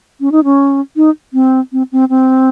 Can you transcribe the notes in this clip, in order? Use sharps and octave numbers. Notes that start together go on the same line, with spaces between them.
C#4
D#4
C#4
D#4
C4
C4
C4
C4